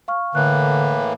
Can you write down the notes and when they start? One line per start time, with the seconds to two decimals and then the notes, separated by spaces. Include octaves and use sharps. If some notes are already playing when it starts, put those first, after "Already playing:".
0.08 F5 C#6 F6
0.35 A2 D3 E3 A#3 F#6